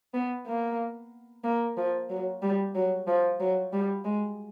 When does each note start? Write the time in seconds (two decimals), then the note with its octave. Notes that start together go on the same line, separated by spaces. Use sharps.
0.14 B3
0.46 A#3
1.44 A#3
1.77 F3
2.10 F#3
2.42 G3
2.75 F#3
3.07 F3
3.40 F#3
3.72 G3
4.04 G#3